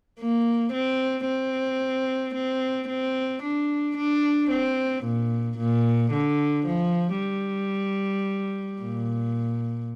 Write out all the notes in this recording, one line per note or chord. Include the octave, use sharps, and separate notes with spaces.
A#3
C4
C4
C4
C4
D4
D4
C4
A#2
A#2
D3
F3
G3
A#2